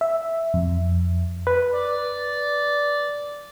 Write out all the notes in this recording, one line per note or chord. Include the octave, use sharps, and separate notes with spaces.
E5
F2
B4
D5